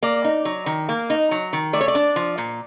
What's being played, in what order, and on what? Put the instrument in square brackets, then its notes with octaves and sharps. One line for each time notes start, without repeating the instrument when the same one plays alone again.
[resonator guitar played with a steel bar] A#3 D5
D#4
F#3
D#3
A#3
D#4
F#3
D#3
A3 D5
C#5
D5
D4
F3
A#2